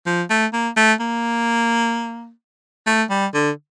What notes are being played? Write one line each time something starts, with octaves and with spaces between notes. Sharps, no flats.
F3
A3
A#3
A3
A#3
A3
G3
D3